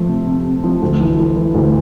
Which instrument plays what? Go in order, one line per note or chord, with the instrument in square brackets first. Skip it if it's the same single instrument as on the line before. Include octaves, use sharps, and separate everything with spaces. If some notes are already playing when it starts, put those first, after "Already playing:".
Already playing: [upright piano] F3 A3
C3
C3
C3
F3
D2
E3
E3
E3
D2